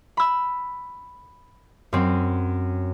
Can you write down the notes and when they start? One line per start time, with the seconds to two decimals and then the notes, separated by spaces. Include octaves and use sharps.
0.17 B5 E6
1.93 F#2 C4